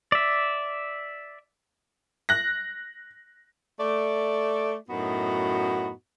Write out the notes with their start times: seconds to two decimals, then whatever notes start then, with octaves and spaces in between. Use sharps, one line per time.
0.12 D5 E5
2.29 F#6 A#6
3.80 A3 D5
4.89 F#2 A2 B3 D#4 F#4